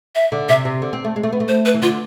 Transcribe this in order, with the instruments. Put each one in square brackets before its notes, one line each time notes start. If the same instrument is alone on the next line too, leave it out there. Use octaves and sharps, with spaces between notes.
[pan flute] E5
[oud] D3
[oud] C3 [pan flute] E5
[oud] C3
D3
C4
A3
G#3
A3
B3
A3
[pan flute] C5
B4
[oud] E3
[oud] D3 [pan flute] F4